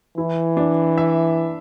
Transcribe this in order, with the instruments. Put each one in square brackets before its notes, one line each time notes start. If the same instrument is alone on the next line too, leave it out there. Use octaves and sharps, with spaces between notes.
[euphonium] E3 [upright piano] E4
[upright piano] D4
E5